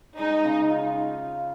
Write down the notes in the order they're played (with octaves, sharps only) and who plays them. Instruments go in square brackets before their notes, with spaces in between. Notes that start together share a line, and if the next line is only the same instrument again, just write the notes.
[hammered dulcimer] G#3 [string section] D#4
[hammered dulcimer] C#3
F4